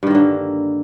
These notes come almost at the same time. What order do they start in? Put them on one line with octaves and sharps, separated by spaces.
G2 D#3 A#3 D3